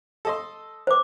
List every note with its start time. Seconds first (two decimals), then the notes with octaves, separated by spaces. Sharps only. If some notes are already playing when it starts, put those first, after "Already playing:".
0.25 A4 D#5 C6
0.87 C5 D6